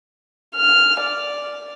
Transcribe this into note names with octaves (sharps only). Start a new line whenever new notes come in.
F6
D5